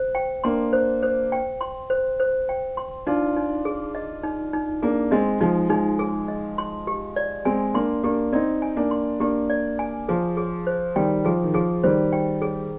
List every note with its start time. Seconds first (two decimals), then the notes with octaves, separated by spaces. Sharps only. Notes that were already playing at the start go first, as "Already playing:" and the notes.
Already playing: C5
0.15 G5
0.44 A#3 D4 C6
0.73 C5
1.03 C5
1.32 G5
1.61 C6
1.90 C5
2.20 C5
2.49 G5
2.77 C6
3.07 D4 D#4 F4
3.36 D#4
3.65 G#4
3.95 D#5
4.24 D#4
4.53 D#4
4.82 A#3 D4 G#4
5.11 G#3 C4 D#5
5.41 F3 G#3 D#4
5.69 F3 G#3 D#4
5.99 G#4
6.28 D#5
6.58 C6
6.87 G4
7.16 D5
7.45 G#3 C4 G#5
7.74 A#3 D4 C6
8.03 A#3 D4 G4
8.33 C4 D#4 D5
8.62 G#5
8.77 A#3 D4
8.91 C6
9.20 A#3 D4 G4
9.50 D5
9.79 G#5
10.09 F3 G#4
10.37 G#4
10.67 C5
10.96 D#3 G3 G5
11.25 F3 G#4
11.44 D#3
11.54 F3 G#4
11.83 D#3 G3 C5
12.12 G5
12.42 G#4